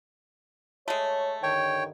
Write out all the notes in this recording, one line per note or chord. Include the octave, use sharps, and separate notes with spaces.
G#3 A3 C#5
G2 D3 D#3 C#5 G5